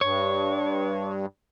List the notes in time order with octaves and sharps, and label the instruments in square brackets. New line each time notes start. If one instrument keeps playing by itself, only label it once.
[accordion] G2 [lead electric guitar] C#5